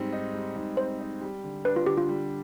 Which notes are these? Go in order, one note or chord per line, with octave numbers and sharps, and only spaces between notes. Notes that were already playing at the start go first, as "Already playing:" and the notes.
Already playing: G#2 G3 C4
D#4
G3
G#2
C4 C5
D#4
G3
D3
D4 B4
F4
D3 G4
F4
G3